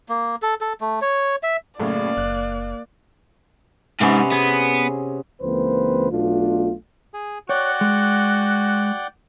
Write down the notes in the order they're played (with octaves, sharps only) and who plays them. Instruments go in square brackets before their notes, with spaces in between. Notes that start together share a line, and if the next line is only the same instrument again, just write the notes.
[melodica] A#3
A4
A4
A3
C#5
E5
[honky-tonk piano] F#2 A2 C#3 [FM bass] A3 [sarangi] A#3 [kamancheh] D5
[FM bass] F#1 [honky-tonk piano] F#6
[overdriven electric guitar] G#2 [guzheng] C3 B3 C#4
[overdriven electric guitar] B3 [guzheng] G#4
[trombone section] C#2 E3 A#3 C4 B4 C5
B1 B2 A3 D4 F4
[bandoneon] G#4
[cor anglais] F#4 [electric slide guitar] C#5 [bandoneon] D5 F#5 G5
[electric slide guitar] G#3